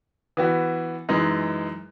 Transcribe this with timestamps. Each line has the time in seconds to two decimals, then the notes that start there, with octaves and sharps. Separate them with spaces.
0.37 E3 B3 F#4
1.09 F#2 E3 G#3 D#4